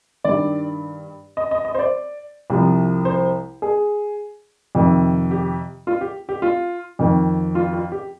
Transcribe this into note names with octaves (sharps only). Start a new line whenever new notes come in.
G2 D#3 D5
D#5
D#5
D#5
C5
D5
C2 C3 F3
C5
G#4
F2 C3 D#3
G4
F4
G4
G4
F4
F2 D#3
F4
F4
G4